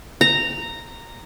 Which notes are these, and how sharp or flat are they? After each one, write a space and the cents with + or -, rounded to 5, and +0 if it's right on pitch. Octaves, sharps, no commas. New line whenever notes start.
A#5 -10